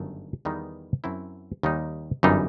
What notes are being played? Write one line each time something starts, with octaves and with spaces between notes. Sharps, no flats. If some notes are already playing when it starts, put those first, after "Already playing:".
Already playing: G1 F#2 D#3 A3
E2 D#3 G3 B3 D#4
F#2 F#3 C4 E4
D#2 D#3 G3 D#4
G1 F#2 E3 G3 D#4